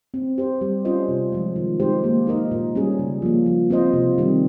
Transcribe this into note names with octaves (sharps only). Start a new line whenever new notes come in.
C4
G4 C5
G3
C#4 F4 C5 D#5
C3
F3 G#3
D#3
G#3 D#4 G4 C5
A#3
D#4 A#4 D#5
A#2
G3 C#4 G#4
C#3
F3 A#3
F3
C4 F4 C5 D#5
C3
D#3 G3 C4